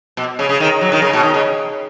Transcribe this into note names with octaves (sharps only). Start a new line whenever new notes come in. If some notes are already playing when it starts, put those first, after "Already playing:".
B2
C#3
C#3
D#3
F#3
D#3
C#3
B2
D#3
C#3